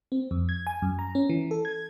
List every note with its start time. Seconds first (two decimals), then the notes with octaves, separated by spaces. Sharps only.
0.12 C4
0.31 F2
0.49 G#6
0.67 G#5
0.82 F#2
0.99 A#5
1.15 C#4
1.30 E3
1.51 A4
1.65 G#6